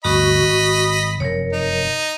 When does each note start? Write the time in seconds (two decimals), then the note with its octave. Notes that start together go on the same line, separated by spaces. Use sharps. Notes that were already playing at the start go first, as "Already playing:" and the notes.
0.05 G1 D2 F#4 D#5 B5 C#6
0.42 G#1
1.20 F1 F#2 A#4 C#5
1.53 D#4